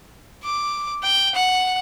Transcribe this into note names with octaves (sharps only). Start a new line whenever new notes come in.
D6
G5
F#5